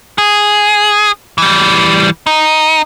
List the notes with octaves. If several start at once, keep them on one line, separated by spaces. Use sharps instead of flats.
G#4
E3 G3
D#4